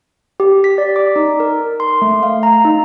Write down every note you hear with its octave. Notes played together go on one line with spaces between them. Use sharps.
G4
B6
D5
D6
D#4
A#4
C6
A3
F5
A#5
D#4